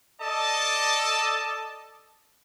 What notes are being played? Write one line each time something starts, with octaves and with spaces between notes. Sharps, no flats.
A4 D5 D#5 A5